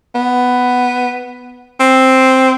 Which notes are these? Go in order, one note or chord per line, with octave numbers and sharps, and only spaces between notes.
B3
C4